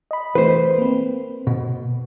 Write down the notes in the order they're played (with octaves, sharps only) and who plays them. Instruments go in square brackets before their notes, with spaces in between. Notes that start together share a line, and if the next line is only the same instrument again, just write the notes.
[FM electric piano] D#5 B5
[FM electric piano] E3 A3 [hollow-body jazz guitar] B4 C5
[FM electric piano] A#3 C4
[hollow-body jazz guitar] B2